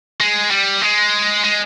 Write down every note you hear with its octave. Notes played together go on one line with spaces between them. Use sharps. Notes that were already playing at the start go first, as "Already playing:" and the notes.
G#3
G3
G#3
G#3